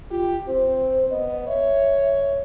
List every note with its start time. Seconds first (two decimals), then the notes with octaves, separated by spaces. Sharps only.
0.11 F4 G4
0.47 C4 C5
1.10 B3 D#5
1.47 C#5 E5